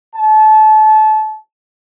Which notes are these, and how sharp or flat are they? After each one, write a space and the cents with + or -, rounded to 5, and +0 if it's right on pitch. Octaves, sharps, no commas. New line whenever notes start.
A5 -30